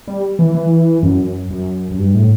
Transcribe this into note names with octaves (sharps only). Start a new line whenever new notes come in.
G3
E3
E3
F#2
F#2
F#2
G2
A2